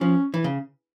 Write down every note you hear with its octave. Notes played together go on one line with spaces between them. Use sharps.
F3 C#4
E3
C#3